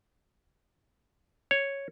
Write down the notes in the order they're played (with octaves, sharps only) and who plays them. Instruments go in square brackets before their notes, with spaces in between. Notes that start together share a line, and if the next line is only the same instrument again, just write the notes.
[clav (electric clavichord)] C#5